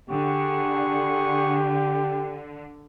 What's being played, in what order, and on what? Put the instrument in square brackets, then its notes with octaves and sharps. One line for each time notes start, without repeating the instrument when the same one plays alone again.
[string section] D3 [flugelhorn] G4 [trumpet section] G#4 F#5 C#6